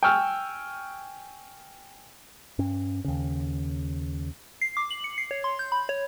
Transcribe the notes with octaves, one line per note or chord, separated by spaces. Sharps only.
G5 G#5 C#6 E6 F6
G2 C#4
D#2 C#3
C7
D6
F#7
C#7
C7
C#5
C6
G6
B5
C#5